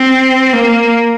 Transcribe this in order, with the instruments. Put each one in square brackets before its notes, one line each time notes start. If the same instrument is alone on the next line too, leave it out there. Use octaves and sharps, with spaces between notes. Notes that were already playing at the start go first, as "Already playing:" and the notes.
Already playing: [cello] C4
A#3